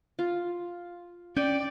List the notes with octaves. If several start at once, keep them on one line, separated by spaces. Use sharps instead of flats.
F4
C#4 D5 G5